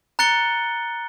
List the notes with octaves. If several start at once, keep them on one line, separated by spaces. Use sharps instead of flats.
A#5 F#6 A6 C#7 G7